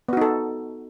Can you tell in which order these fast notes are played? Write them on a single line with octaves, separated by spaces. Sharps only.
B3 F#4 D#4 A4